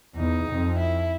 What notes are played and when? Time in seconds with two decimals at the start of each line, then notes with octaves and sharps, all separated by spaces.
0.16 E2 D#4
0.48 F2
0.79 E4